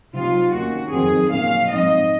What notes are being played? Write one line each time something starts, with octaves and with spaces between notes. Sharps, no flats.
C3 F#3 C4 D#4 F4
D#2 D#3 A#3 C#4 F#4
F2 D#3 F#3 C4 G#4
A#2 F#3 C#4 F5
G#2 F3 C4 D#4 D#5